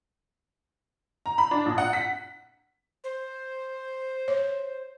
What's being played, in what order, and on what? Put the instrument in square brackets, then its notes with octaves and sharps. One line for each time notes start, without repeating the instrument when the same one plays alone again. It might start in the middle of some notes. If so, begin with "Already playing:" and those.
[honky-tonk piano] A#5
B5
D4
A#1
F#5
B6
[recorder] C5
[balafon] C#5